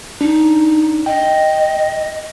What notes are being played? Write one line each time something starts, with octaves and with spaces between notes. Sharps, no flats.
D4 D#4
D#5 G5